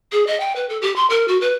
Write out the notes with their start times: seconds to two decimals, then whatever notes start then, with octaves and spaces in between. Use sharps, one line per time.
0.12 G#4
0.27 D#5
0.40 G5
0.56 B4
0.69 A4
0.82 G4
0.96 C6
1.10 A#4
1.28 F#4
1.41 B4